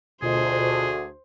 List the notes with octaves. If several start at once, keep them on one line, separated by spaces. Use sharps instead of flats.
D2 B2 F4 G#4 C5 D#5